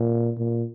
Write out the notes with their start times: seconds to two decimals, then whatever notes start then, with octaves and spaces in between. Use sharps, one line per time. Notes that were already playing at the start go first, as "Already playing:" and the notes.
Already playing: A#2
0.38 A#2